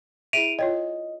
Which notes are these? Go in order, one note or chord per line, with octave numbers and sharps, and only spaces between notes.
E4 G#4 E5 D7 D#7 F7
F4 C#5 D#5 G5